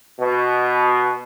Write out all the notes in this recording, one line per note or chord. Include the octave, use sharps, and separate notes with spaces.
B2